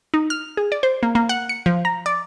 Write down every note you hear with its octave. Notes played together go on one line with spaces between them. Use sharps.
D#4
F6
G#4
D5
C5
A#3
A#3
F#5
C#7
F3
A#5
D5